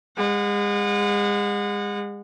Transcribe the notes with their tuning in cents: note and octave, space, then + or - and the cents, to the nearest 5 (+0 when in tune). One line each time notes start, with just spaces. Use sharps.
G#3 -35 F#5 -25